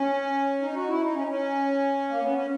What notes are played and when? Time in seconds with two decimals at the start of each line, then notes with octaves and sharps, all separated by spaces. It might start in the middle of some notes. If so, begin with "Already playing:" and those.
Already playing: C#4
0.61 D#4
0.75 F#4
0.88 E4
1.01 D#4
1.14 C#4
1.27 C#4
2.09 A#3
2.20 B3
2.33 C#4